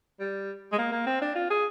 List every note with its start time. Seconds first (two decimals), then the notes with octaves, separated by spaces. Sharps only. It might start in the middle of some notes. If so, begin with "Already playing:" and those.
0.20 G3
0.72 G#3
0.78 A#3
0.92 A#3
1.06 C4
1.21 D4
1.35 F4
1.50 G#4